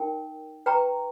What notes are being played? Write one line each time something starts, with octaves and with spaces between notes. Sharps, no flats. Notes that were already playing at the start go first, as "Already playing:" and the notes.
Already playing: D#4 A#4 G5
B4 G5 A#5 C#6